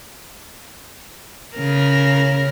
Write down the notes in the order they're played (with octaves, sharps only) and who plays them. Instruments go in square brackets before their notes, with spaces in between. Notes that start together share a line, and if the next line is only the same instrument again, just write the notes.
[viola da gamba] C#3 A#4